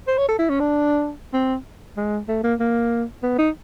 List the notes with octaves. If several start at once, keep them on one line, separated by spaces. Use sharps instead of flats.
C5
C#5
A4
E4
C#4
D4
C4
G#3
A3
A#3
A#3
B3
D#4